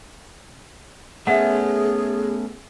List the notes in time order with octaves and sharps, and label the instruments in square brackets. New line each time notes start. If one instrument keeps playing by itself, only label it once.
[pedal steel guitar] A3 B3 C#4 [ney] G#4 [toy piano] E5 F#5